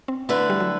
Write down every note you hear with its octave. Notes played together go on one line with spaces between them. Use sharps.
C4
D3 A3 B3 E4 B4
G3
F#3